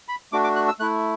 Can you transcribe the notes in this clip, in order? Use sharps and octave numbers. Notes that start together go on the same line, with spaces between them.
B5
A3 D4 F#4 D6
D6
F#6
E6
A3 E4 F#6